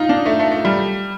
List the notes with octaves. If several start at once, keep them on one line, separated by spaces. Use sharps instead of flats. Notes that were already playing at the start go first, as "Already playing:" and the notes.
Already playing: D#4 F4
D4
A3
A3
A3
G3